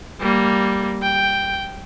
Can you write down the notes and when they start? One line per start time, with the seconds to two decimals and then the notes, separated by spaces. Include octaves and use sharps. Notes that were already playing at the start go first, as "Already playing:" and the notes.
0.21 G3 A#3
1.02 G5